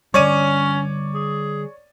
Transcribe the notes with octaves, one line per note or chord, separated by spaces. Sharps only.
D3 G3 C#4 C#5 D5 D#7
G#4